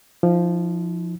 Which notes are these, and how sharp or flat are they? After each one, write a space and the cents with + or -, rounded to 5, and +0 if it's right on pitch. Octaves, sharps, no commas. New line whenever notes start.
F3 -5 D#4 +40